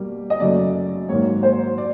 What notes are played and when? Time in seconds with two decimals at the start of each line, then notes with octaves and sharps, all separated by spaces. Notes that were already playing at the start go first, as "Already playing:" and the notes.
Already playing: B2 G3 A#3
0.30 D#5
0.40 F#2 C#3 F#3 A3 D5
1.09 G#2 D#3 F#3 A#3 C#5
1.43 C5
1.78 D5